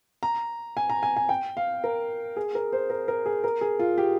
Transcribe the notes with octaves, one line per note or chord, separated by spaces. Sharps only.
A#5
G#5
A#5
G#5
G#5
G5
F5
A#4
G#4
A#4
C5
A#4
A#4
G#4
A#4
G#4
F4
G4